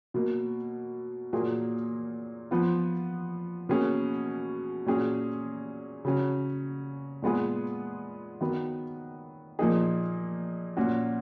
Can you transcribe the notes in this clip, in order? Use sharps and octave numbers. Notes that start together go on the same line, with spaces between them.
B2 F#3 A#3
A#2 F#3 A#3 F4 G#4
F3 B3 F4
B2 A#3 C#4 G#4
A#2 F#3 C#4 G#4
C#3 F#3 C#4
A#2 G#3 B3 F4 G#4
D#3 F#3 B3
A#2 F3 A#3 D#4 G#4
A#2 F#3 C#4 F#4